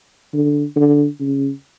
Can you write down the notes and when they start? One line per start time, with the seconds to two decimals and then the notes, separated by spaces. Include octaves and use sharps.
0.33 D3
0.76 D3
1.20 C#3